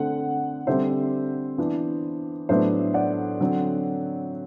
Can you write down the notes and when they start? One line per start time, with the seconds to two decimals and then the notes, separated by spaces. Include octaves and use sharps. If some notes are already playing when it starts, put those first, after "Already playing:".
Already playing: D3 A3 C4 F#5
0.67 D3 G3 C4 C5 E5
1.58 E3 B3 D4
2.49 A2 F#3 B3 D4 C5 E5
2.94 D5 F#5
3.40 D3 F#3 C4